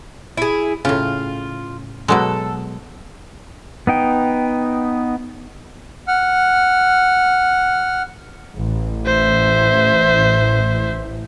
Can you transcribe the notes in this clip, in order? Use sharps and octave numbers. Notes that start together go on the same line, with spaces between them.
E4 G#4
A2 C#3 F4
B2 F#3 G#3 A4
B3 D#4 G5
F#5 F6
A1
C5 E5